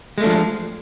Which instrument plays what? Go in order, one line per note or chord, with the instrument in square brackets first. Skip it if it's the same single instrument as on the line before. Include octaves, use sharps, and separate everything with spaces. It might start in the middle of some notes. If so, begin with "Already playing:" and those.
[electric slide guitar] G#3
A3
D4
F3